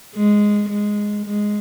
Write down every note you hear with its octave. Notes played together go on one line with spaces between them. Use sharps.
G#3
G#3
G#3